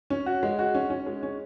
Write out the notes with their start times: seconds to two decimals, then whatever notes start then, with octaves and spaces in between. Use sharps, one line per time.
0.10 C#4
0.26 F#4
0.43 G#3
0.59 F#4
0.75 C#4
0.90 C#4
1.06 G#3
1.23 C#4